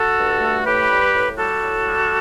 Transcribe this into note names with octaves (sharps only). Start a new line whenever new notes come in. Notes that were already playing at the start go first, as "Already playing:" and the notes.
Already playing: F#4 A4
G2
A3
A2 G4 B4
G3
A2
G3 F#4 A4
A2
G3